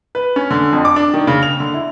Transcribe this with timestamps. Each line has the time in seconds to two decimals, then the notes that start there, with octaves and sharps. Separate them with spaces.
0.15 B4
0.36 C#4
0.51 D3
0.73 F2
0.85 D6
0.96 D4
1.14 D#3
1.27 C#3
1.43 F7
1.60 D3
1.74 E4